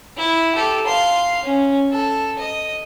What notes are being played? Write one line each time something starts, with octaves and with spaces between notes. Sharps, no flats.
E4
G4 A4
F5 C6
C#4
A4
D#5